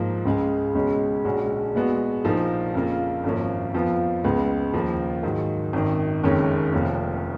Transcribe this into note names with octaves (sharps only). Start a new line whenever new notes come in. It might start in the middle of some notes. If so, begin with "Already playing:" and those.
Already playing: G#2 F3 A#3
C#2 C#3 G#3
C#2 B2 G#3 C#4
A#1 A#2 G#3 C#4 F#4
A#2 G#3 B3 F#4
A#1 A#2 F3 A#3 D#4
F2 C#3 F3 A#3 F4
G#1 F#2 F3 A#3 C#4
F2 F3 B3 F4
C#2 C#3 G#3 B3
D#2 C#3 F3 A#3
G#2 D#3 F#3
G#1 F#2 D#3
F#1 F2 D#3 G#3 C#4
F1 F2 F3 A#3 C#4